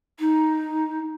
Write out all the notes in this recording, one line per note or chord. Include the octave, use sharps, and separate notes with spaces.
D#4